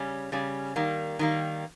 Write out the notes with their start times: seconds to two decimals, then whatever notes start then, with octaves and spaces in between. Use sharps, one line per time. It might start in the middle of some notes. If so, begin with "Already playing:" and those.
Already playing: C#3 G3 C#4
0.32 C#3 G3 C#4
0.76 D#3 G3 A#3
1.19 D#3 G3 A#3